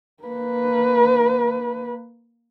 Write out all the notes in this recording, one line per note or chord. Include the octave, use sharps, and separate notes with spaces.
A#3 B4